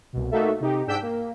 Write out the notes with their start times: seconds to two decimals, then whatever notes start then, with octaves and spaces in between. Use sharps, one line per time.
0.13 C2 B2
0.31 A3 A#3 D#4 F#4 A4 E5
0.60 C3 D#4 G4
0.87 G#2 D4 G5 E6 G6 B6
1.02 A#3